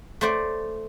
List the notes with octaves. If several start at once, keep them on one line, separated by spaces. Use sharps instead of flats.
A3 C5 D5